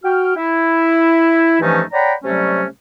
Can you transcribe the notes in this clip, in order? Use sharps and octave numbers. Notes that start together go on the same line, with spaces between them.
F#4 G5 F6
E4
G2 E3 F3 A3 C#4 D#4
C#5 D5 F#5 G5 A#5 B5
C3 F#3 G3 A3 C#4